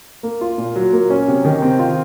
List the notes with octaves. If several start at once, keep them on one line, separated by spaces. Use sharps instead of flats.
A#3
F4
A#2
F#3
A#3
C#4
C3
D#3
C4
F4